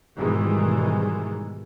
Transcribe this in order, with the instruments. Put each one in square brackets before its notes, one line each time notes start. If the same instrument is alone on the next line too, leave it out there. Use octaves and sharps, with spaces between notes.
[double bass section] G#2 B2 D#3 E3 G3 G#3